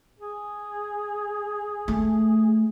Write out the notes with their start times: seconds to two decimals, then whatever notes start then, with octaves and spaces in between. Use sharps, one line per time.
0.19 G#4
1.88 A3